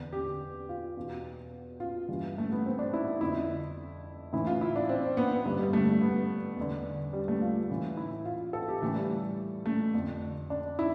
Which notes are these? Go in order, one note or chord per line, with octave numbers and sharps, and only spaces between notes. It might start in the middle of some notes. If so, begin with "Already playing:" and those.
Already playing: E2 D3
G4
F4
E2 B2
F4
G2 E3
A3
B3
C4
D4
E4
F2 D3 E4
A2 E3 E4
F4
E4
D4
C4
B3
G2 D3 B3
G3
A3
B3
E2 D3
G3
A3
F4
A2 E3
E4
F4
A4
G4
A2 E3 A3
G3
A3
F2 D3
D4
E4